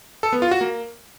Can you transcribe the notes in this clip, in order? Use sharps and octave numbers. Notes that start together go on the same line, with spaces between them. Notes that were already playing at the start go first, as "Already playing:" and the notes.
A4
B3
F4
F#4
A#3